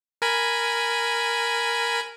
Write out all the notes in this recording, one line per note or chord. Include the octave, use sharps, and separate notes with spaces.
A#4 G#5 B5